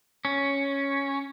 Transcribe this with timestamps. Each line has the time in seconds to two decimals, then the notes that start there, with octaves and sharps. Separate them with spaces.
0.25 C#4